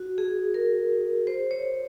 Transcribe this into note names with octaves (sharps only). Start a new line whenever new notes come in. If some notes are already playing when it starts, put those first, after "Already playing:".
Already playing: F#4
G#4
A#4
C5
C#5